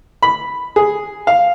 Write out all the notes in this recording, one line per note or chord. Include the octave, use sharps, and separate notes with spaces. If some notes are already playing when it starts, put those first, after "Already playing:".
B5
G#4
F5